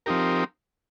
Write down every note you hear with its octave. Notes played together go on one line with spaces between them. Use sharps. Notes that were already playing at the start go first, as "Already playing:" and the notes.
F3 C4 D#4 G4 A#4